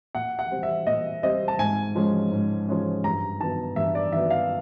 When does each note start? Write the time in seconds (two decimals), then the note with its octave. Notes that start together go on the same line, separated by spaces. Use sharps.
0.15 A#2 F#5
0.39 F#5
0.51 G3 C4
0.63 E5
0.87 A#2 D#5
1.23 G3 C4 D#5
1.48 A5
1.59 G#2 G#5
1.95 F3 G#3 C#4
2.31 G#2
2.68 F3 G#3 C#4
3.04 G2 A#5
3.40 D#3 F#3 B3 A5
3.76 G2 E5
3.95 D5
4.12 D#3 F#3 B3 E5
4.30 F5